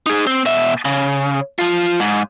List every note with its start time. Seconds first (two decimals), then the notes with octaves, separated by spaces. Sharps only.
0.06 D#4 G#4
0.27 C4
0.46 B2 E5
0.85 C#3
1.59 F3 F4
2.00 G#2